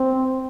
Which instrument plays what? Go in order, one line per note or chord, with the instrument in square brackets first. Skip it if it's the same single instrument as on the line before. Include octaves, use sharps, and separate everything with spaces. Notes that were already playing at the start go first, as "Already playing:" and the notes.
Already playing: [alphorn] C4